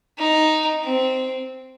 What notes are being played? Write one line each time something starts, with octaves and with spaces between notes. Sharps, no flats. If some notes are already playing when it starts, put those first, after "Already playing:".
D#4
C4